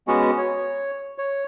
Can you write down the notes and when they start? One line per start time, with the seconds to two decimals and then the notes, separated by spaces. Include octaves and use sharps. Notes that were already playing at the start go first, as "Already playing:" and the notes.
0.08 G#3 B3 C#4 F#4
0.38 C#5
1.18 C#5